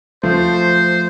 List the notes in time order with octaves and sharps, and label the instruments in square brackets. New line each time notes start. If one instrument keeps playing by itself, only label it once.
[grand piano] F3 A3 [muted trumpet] C5